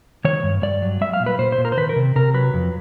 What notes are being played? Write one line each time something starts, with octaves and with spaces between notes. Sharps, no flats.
D#3 C#5
G2
G2 D5
F#3
G3 E5
F5
A#2
B4
A#2 C5
C5
A#2
A#4
C5
D#3 B4
A#4
C3
C3 A#4
F#3 B4
F2